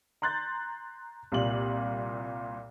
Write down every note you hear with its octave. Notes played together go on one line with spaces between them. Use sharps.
A#5 C6 F#6 G6 A6
C2 A#2 F#7